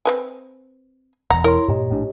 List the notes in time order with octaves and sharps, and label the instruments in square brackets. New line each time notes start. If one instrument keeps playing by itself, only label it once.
[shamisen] C4 B4 G#5
[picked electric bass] E1 E2 [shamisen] F#5 [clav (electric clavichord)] A#5
[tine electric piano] E4 C#5 C6 [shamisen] A#4
[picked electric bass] G2 A#2 [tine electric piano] G4 C#5 D#5
[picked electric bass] A#1 A2 D4